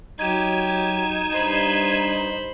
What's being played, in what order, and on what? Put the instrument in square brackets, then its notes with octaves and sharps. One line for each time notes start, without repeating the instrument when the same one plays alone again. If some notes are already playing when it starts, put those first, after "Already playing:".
[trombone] F#3 [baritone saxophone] D#4 [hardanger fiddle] G4 [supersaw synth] G#6 D#7 E7
[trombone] G2 [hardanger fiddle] C5 B5